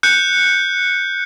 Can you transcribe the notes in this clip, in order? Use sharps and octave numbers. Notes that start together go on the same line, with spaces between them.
F#6 G6 C#7